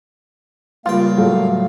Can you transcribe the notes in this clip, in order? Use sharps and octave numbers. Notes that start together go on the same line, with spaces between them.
C#2 G2 A#3 F4 F5 G5
A2 F#3 A3